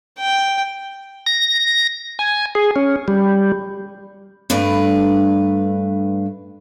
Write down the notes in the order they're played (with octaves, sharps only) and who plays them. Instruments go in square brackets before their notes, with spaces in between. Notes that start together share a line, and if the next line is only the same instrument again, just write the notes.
[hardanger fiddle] G5
[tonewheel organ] A#6
G#5
G#4
C#4
G3
[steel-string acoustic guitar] G2 A3 D4 B4